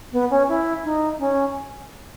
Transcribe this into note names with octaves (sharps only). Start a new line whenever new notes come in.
B3
C#4
E4
D#4
C#4